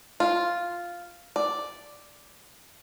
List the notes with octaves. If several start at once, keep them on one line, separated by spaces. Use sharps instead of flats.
F4
D5